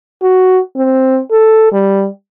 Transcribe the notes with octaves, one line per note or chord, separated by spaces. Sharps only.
F#4
C4
A4
G3